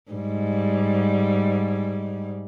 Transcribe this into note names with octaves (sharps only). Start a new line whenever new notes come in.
G#2 G3